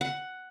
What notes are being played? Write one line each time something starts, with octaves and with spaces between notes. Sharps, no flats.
F#5